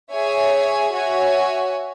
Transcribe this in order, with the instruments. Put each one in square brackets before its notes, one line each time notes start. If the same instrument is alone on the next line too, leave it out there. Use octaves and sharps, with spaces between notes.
[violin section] G#4 C#5 E5 G#5
F#4 C#5 E5 G#5